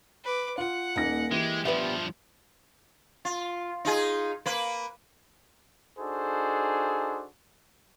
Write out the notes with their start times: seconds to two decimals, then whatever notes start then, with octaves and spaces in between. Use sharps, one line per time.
0.24 B4 D6
0.58 F4 F#5
0.96 D#1 A#3 D#4 A#6
1.32 E3 G#3 G4
1.65 G2 F3 G3 B3 B4 E5
3.25 F4
3.85 D#4 F4 G#4
4.46 A#3 B4
5.99 D4 D#4 F#4 G#4 A4 C5